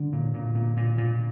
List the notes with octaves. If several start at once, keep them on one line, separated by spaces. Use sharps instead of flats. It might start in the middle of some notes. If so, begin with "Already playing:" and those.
Already playing: D3
A#2
A#2
A#2
A#2
A#2